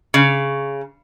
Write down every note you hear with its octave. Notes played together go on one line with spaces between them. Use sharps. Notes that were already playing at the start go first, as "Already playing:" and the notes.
C#3